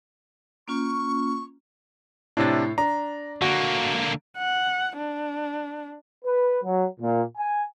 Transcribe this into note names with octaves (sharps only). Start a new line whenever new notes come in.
A#3 C#4 F4 C#6
A2 C3 D4 C#5 A6
D4 A#5
D3 A#3 F#4
F#5
D4
B4
F#3
A#2
G#5